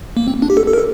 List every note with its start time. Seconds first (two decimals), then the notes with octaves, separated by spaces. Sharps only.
0.17 A#3
0.28 C4
0.42 D4
0.50 G4
0.57 A4
0.67 A4
0.73 A#4
0.78 A4